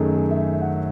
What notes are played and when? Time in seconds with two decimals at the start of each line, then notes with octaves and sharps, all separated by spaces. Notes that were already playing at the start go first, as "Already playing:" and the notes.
Already playing: F#2 D#3 A3 G#4
0.16 G#4
0.31 E5
0.47 E5
0.62 F#5